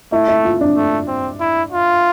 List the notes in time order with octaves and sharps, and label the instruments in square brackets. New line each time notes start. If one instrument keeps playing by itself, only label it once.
[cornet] A3 [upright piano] E4
[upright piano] E4
F4
D4
[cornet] A3
C4
E4
F4